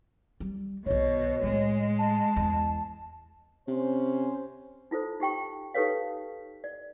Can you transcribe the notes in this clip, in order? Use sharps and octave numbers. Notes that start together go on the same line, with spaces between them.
G3
B1 B2 D#3 C#5
A2 G#3
A5
E2
C3 C#4 C5
D#4 F4 A4 C5
D#4 G4 G5 C#6
D#4 G4 A4 B4 C#5 F5
D5